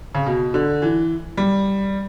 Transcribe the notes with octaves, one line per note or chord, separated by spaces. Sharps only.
C#3
B2
D3
E3
G3